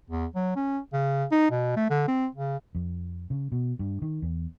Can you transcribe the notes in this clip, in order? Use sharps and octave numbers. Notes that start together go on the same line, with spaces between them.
E2
F#3
C#4
C#3
D#4
B2
A3
D3
C4
C#3
F2
C#3
B2
G2
D#3
E2